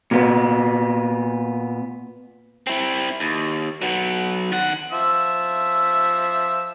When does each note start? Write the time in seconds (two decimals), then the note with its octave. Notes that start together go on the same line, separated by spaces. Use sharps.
0.11 A#2 B3
2.67 C4 E4
3.20 D#2
3.82 F#3 B3
4.52 D#3 F#5
4.92 F3 E5 E6